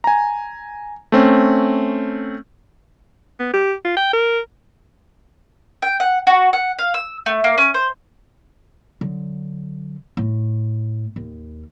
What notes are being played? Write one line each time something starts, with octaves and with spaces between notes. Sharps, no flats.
G#5 A#5
A3 C4 C#4
B3
G4
F4
G5
A#4
G5
F#5
F#4
F#5
F5
E6
A3
A#3
C#4
C5
D3 F#3
A2
D#2